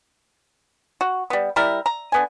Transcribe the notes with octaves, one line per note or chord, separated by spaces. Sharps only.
F#4
G3 B3
G3 E4 A#4
A#5
D3 B3 G#5